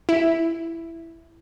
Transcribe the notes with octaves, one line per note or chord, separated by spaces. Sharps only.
E4